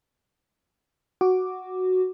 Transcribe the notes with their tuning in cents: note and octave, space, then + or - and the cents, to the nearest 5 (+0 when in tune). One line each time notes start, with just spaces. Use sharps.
F#4 +0 D6 +0